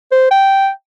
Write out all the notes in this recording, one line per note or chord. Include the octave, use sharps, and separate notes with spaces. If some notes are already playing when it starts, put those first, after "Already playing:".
C5
G5